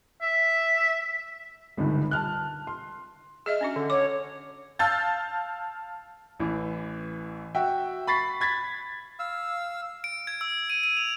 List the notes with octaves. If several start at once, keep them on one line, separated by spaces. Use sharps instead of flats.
E5
G1 C#2 G2 D3 D#3
A5 F6 F#6
C6
G#4 D#5 E5 F6
C#4 D4 F#4
D3
C#5 D6
F5 A5 E6 G6 A6
A1 E3
F#4 E5 G5
B5 C#6 A6 B6 C7
B5 G#6 A6 B6
F5 E6
D7
G#6
E6
D#7
D#7
F7